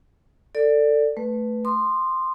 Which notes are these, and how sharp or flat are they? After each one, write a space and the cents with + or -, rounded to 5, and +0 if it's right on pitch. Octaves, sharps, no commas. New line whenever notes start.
A4 +25 D5 +0
A3 +5 B4 +0
C6 +0 D#6 -45